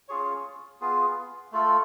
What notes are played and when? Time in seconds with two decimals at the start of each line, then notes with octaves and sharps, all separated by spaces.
0.08 C#4 F4 G#4 C#5
0.81 B3 F4 G#4
1.52 A3 F4 A4